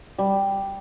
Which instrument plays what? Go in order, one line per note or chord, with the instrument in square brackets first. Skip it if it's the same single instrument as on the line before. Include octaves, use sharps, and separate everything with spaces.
[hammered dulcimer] G3